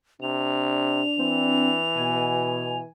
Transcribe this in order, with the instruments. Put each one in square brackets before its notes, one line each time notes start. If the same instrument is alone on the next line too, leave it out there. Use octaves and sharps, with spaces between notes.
[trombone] C3 [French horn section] D4 [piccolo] F7
[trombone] E3 [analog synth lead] C4
[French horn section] B2 [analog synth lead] G#5